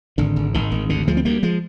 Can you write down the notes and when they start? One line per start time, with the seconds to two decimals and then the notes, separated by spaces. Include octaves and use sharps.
0.18 G#1 D3
0.36 G#1
0.54 G#1 D#3
0.72 G#1
0.89 D2 D3
1.07 D2 F3 G#3
1.17 C4
1.25 D2 G3 A#3
1.43 F3 G#3